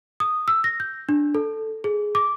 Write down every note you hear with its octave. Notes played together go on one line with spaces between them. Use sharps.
D#6
E6
A#6
G6
D4
A4
G#4
D6